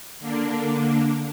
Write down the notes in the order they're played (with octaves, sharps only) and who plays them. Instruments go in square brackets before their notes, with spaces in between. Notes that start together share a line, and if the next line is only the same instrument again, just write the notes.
[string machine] D3 A#3 D4